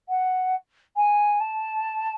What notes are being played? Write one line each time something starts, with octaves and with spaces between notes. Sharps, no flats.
F#5
G#5
A5